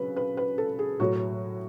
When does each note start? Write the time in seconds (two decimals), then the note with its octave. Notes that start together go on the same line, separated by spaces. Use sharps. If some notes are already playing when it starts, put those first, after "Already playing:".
Already playing: C#3 F#3 B4
0.16 B4
0.37 B4
0.58 A4
0.79 G#4
1.00 A2 F#3 F#4